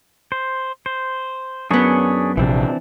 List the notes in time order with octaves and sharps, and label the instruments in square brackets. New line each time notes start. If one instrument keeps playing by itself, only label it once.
[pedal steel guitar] C5
C5
[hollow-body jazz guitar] F#2 B3 [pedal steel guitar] D4 G#4 C#5
[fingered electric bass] A#1 C3 [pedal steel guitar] E3 C4 D4